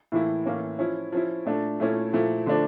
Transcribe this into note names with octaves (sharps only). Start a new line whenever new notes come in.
A2 E3 A#3 E4
A2 E3 A#3 C#4
F3 C#4 E4
F3 C#4 E4
A#2 A3 D4
A#2 A3 C#4 E4
A#2 F3 A3 E4
D3 F3 A3 D4